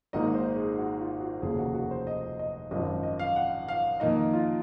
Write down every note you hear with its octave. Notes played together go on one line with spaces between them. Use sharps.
G#1 G#2 D#3 A#3 D#4 D#5
C5
G#4
F#4
F4
F#4
F1 D#2 C#3 F3 A#3 G#4
F#4
F#4
C5
D#5
D#5
G#1 F#2 F3 D#5
D#5
F5
F#5
F5
F2 D#3 A#3 D#4 D#5
F4